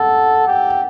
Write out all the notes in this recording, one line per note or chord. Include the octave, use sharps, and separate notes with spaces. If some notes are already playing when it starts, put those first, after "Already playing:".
Already playing: A4 F#5
G4